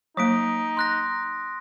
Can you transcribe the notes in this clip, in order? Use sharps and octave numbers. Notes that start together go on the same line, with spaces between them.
F#3 A#3 D#4 D#6 B6 D7
C6 F#6 A#6